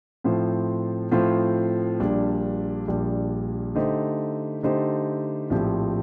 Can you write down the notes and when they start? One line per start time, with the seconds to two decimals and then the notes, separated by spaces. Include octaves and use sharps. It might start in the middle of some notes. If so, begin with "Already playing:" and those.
0.24 A2 F3 C4 F4 C5
1.11 A2 F3 C4 F4 C5
2.00 A#1 A#2 G3 D4
2.88 A#1 A#2 G3 D4
3.75 D3 A3 D#4 G4 C5
4.63 D3 A3 D#4 G4 C5
5.50 A#1 A2 F3 C4 G4